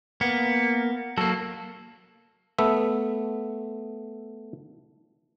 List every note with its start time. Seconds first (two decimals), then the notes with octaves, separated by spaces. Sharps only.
0.21 A#3 B3
1.18 F#3 A#3 A4
2.58 A3 B3 E5